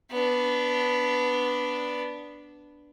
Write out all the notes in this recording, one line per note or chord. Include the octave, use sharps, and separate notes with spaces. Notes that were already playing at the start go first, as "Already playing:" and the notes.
B3 D4